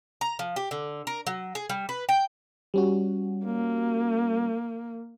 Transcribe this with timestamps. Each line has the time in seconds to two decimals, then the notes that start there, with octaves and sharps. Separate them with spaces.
0.21 A#5
0.39 F3
0.56 G4
0.71 D3
1.07 A#4
1.27 F#3
1.55 G#4
1.70 G3
1.89 B4
2.09 G5
2.74 G3 C#4 F#4
3.45 A#3